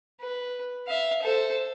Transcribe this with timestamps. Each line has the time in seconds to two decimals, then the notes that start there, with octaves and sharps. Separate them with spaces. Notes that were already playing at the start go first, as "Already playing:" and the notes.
0.21 B4
0.88 E5 F5
1.22 A4 C5